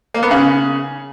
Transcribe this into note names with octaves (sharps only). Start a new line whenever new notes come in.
A#3
B3
C#3